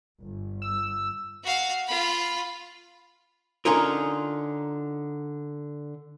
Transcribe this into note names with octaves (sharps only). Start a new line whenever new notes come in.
G1
E6
F#4 F5
F4 B5
D3 C#4 D#4 F4 A#4